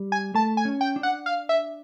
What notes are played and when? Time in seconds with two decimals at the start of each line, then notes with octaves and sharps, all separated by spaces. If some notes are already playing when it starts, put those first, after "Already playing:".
Already playing: G3
0.12 G#5
0.35 A3 A5
0.57 G#5
0.65 C#4
0.81 G5
0.96 D4
1.03 F#5
1.26 F5
1.49 E5